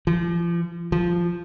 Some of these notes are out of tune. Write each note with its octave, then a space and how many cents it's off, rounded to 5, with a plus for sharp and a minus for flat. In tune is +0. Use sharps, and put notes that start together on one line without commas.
F3 -35
F3 -5